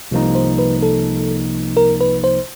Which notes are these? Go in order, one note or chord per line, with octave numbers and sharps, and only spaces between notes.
C2 C3 F3 A#3 D#4
C5
B4
A4
A#4
B4
C5